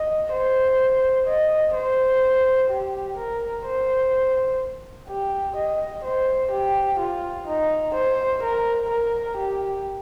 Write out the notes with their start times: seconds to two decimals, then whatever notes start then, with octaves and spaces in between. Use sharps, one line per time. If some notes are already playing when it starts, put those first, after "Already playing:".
Already playing: D#5
0.32 C5
1.27 D#5
1.75 C5
2.70 G4
3.18 A#4
3.66 C5
5.09 G4
5.56 D#5
6.05 C5
6.52 G4
6.99 F4
7.47 D#4
7.95 C5
8.43 A#4
8.90 A#4
9.37 G4